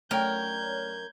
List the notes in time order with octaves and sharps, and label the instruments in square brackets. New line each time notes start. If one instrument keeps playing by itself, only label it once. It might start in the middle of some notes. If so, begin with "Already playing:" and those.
[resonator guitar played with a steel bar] F#2 G5 [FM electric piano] A3 C#5 D5 [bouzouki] A#4 [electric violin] G6 G#6